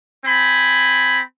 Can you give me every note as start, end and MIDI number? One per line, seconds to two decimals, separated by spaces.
0.25 1.20 60
0.25 1.20 80
0.25 1.20 83